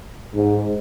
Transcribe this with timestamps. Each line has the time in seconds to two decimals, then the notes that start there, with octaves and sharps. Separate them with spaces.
0.35 G#2